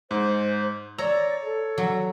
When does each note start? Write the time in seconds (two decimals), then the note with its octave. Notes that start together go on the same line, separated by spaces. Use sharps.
0.11 G#2 C5
0.98 C#5 D5 A#5 E6
1.42 A4
1.78 F#3